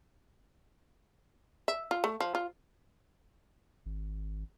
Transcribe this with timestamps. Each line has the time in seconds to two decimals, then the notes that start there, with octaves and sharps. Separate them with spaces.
1.68 E5
1.91 F4
2.04 A3
2.20 F3
2.35 F4
3.86 G#1